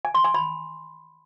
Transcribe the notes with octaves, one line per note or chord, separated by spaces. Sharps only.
G#5
C6
G#5
B5